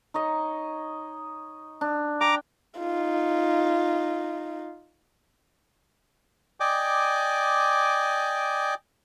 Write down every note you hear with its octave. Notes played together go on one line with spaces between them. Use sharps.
D#4 C#5 D#5
D4
G5 A#5 D6
D#4 F4
D5 D#5 G5 G#5 D6